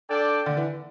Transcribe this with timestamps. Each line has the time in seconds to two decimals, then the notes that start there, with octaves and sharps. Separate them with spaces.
0.09 D4 A4 D5 G5
0.46 D3
0.57 E3